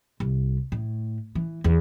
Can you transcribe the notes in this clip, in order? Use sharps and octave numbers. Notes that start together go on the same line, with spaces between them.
C2
A2
E3
E2